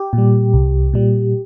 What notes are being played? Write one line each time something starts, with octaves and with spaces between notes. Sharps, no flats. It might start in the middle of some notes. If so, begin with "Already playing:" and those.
Already playing: G4
A#2
G3
C2
A#2 G3